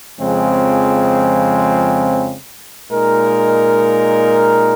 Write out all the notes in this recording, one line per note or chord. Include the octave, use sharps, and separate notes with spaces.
F2 C#3 F3 G#3 C4
A#2 G#3 D#4 A#4